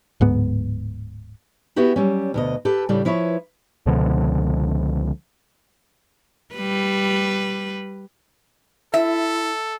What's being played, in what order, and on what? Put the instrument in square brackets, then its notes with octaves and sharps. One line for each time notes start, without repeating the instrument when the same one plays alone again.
[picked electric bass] D1 G#2 B3
[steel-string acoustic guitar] B3 E4 F#4 G4 B4
F#3 G3 C#4
D2 B2 D#5
G4 A4 B4
A2 C#3 G3 D4
F3 E4 B4 C#5
[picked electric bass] C#2 B2 D3 F3
[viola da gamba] G3 B4
[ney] E4 [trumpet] A4 [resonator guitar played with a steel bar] E5